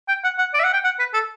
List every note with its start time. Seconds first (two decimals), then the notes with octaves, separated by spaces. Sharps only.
0.08 G5
0.24 F#5
0.38 F#5
0.54 D5
0.60 E5
0.64 F#5
0.73 G5
0.84 F#5
0.99 B4
1.14 A4